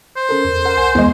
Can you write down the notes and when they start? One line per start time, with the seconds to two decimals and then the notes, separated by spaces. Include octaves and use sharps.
0.16 C5
0.29 C#4 A4 A#4
0.45 E2
0.65 A#4 F#5
0.77 C2 G#5 G6
0.95 E2 G#3